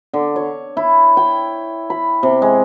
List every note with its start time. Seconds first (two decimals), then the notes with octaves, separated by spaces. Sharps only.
0.14 D3
0.36 C#5
0.77 E4
1.17 G5
1.90 B5
2.23 C3
2.42 G#3